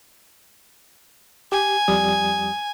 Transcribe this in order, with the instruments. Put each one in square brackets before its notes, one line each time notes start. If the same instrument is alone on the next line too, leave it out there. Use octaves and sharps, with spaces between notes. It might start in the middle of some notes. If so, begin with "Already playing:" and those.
[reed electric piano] G4 [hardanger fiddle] G#5
[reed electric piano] F2 G3 D#6